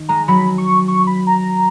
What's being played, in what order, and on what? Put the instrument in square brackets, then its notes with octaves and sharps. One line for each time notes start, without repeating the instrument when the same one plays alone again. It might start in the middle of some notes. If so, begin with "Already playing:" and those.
Already playing: [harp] D#3
[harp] G#3 [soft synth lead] A#5
[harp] F#3 [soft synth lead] B5
[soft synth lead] C#6
C#6
B5
A#5